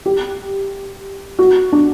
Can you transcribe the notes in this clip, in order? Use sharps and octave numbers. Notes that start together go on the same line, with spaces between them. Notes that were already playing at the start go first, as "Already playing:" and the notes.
G4
F#4
D4